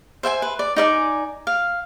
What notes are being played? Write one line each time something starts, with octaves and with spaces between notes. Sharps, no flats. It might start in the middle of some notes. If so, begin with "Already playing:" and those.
C5 E5 G5 G#5
B4
D5
D#4 D5 E5 G#5
F5